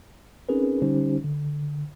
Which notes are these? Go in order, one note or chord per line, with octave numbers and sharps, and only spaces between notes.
C4 C#4 D#4 G#4 A#4 B4
D3 G3 C#4 D#4 G4 C5
D3